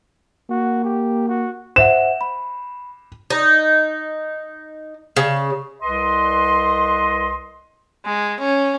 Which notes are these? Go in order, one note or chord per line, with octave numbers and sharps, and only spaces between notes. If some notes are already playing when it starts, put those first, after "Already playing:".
A#3 F#4
G4
F#4
C5 E5 F#5 E7
B5
D#4
C#3
C2 B4 D#5 C6
G#3
C#4